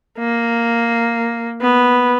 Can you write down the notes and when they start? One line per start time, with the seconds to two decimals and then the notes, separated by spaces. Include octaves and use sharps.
0.19 A#3
1.62 B3